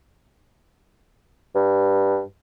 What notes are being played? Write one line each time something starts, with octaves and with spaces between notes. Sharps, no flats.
G2